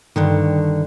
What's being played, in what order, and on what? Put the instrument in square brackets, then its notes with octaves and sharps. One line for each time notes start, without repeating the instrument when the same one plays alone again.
[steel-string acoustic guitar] G2 D3 D#3